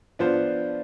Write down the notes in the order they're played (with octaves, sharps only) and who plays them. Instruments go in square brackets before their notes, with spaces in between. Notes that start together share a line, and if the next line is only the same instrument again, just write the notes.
[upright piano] F3 B3 D4 F4 C5